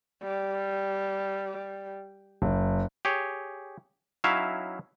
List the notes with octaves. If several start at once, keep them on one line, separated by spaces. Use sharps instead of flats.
G3
F#1
G4 G#4 C#5
F#3 C#4 D#4 E4 E5 F5